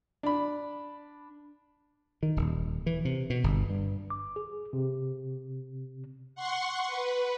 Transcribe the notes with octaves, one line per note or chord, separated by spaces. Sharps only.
D4 B5
D#3
D#1
E3
C3
B2
G1
G2
D6
G#4
C3
F#5 C6 C#6
B4